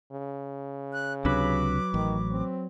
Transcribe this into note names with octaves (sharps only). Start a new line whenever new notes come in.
C#3
F#6
C#2 C3 F#3 D4 B4 D6
A1 D#3
C4